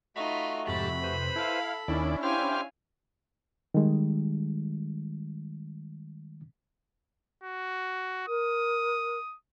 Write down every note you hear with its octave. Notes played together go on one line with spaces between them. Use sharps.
A3 D#4 F4 F#4 B5
F2 G#2 C3 G4 A5 B5
B4 C5
E4 A4 F5
D#2 D#3 C#4 D4 E4 D5
G4 C5 F5 G5 G#5 F6
D#3 G3 G#3
F#4
A#4 D#6